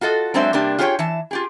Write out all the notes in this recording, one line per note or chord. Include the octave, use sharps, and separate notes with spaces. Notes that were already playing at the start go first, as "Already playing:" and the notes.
F4 F#4 A4 D#5
F#3 G#3 C4 D4 C5 E5
C3 G3 A#3 D4 G4
F4 G4 G#4 C5 C#5 G5
E3 A5
F4 G4 G#4